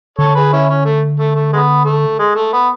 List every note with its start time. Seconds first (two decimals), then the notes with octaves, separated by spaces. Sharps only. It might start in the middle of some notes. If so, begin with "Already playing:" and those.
0.18 D3 A4 C#5
0.35 G#4 B4
0.53 C#4 E4
0.70 C#4
0.85 A3
1.19 A3
1.35 A3
1.53 G#3 B3
1.85 A3
2.19 G#3
2.35 A3
2.53 B3